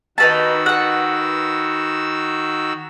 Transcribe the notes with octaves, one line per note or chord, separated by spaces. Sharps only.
D#3 D#4 F#4 B4 A5 E6
B4 F#5